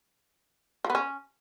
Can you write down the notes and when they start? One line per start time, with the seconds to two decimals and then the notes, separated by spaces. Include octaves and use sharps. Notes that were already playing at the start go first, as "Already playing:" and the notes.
0.84 F3
0.90 B3
0.95 C#4